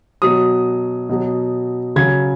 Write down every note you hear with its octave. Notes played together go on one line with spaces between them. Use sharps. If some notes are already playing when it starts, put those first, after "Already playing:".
B2 F#3 D#6
B2 F#3
C#3 F#3 G#6